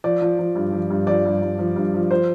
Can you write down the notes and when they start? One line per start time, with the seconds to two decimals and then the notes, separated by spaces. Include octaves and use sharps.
0.04 F3 D5
0.22 F3
0.39 F3
0.56 G2
0.73 F3
0.90 G2
1.07 F3 D5
1.25 G2
1.42 G2
1.58 F3
1.76 G2
1.94 F3
2.11 F3 C5